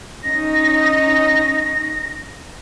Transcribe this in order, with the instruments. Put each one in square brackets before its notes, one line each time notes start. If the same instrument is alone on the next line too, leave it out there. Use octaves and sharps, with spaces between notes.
[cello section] C#4 D#4 [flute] A#6